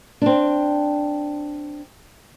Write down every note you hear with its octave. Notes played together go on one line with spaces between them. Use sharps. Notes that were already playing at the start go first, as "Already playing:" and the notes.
C4 D4